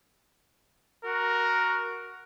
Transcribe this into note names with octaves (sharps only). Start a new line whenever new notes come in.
F#4 A#4